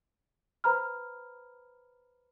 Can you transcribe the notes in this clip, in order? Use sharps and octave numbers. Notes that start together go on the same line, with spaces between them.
B4 C5 A#5 B5 F6